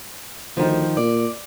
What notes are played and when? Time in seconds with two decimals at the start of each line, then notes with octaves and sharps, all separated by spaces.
0.57 D2 D#3 F3
0.97 A#2 D5